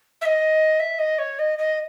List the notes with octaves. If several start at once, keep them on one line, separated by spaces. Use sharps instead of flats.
E5
D#5
E5
D#5
C#5
D#5
D#5